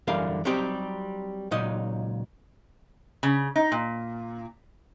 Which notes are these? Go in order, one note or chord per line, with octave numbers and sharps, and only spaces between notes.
F#2 D3 E3 G3 A#4 F5
F#3 G3 C4 D#4 G4
C#2 A#2 F#3 D#4 D#5
C#3
D#4
A#2